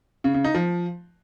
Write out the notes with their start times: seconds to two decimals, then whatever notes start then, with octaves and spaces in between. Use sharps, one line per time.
0.24 C#3
0.34 C#3
0.44 D#4
0.55 F3